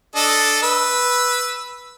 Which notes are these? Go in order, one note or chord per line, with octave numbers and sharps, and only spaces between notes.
D4 A4 D#5
B4 E6